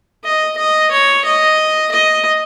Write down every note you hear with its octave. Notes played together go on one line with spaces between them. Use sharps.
D#5
D#5
C#5
D#5
D#5